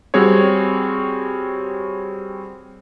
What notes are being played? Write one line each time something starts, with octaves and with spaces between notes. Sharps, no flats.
G3 C4 F#4 G#4 C#5